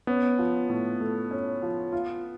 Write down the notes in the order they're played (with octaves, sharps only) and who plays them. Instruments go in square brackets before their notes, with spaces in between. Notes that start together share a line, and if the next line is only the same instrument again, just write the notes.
[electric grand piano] B3 [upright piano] C#4
[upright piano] F3
A2
A3
C#4
F3
F4